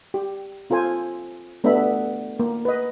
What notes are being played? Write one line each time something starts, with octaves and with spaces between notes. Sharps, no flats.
G4
C4 F4 A4 C5 G#5
A3 B3 D4 G4 E5 B5
A#3
B4 D#5